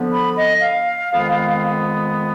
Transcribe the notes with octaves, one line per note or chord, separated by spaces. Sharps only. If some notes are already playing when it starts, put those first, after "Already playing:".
Already playing: D3 F3 B3
B5
D#5
F5
F2 D#3 G#3 B3